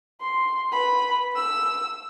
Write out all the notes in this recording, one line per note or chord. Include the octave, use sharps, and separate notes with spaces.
C6
B4 B5
E6